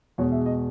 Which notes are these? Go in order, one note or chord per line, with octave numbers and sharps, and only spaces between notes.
E2 B2 G#3 C#5
E5
D#5